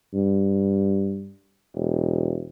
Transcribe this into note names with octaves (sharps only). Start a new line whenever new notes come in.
G2
E1